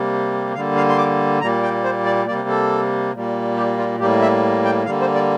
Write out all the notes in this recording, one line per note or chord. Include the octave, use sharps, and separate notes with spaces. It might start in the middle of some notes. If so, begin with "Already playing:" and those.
Already playing: C3 G3 A#3
D3 G3 A#3 F5
F5
C6
D6
A#2 G3 A#3 A#5
G5
C5
D5
C3 G3 A#3 D5
A4
A#2 G3 A#3
G4
F4
A2 G3 A#3 G4
E5
G5
D3 G3 A#3 F5
C5
D5